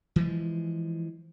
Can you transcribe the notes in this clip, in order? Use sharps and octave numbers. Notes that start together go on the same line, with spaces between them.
E3 F3 G#3